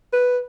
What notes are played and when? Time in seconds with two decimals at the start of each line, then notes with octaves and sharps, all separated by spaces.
0.13 B4